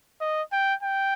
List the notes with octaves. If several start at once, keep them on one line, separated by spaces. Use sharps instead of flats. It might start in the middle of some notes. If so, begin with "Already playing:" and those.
D#5
G5
G5